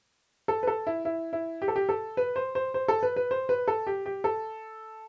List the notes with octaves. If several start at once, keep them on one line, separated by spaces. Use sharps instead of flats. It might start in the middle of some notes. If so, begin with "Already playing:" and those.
A4
B4
A4
E4
E4
E4
G4
A4
G4
A4
B4
C5
C5
C5
A4
B4
B4
C5
B4
A4
G4
G4
A4